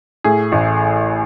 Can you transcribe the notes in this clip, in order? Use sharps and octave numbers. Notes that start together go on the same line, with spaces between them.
A2 G#4
A1